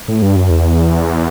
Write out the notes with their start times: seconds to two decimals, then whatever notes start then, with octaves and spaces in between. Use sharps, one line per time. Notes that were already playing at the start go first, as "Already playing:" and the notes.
0.08 A2
0.22 G2
0.36 F#2
0.50 E2